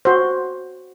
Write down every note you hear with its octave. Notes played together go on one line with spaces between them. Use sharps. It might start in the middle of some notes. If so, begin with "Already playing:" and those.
F#4 C5